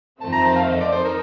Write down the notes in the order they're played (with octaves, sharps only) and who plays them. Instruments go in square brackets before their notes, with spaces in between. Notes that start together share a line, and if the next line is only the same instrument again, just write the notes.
[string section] F2 D#3 A3 C4 [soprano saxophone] A5
[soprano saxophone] A#5
A5
F5
D#5
D5
[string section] D#4 A4 [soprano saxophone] C5
[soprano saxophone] A#4